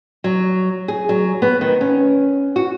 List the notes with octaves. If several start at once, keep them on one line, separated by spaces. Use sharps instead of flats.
F#3
G#4
F#3
B3
D#3
C#4
F#4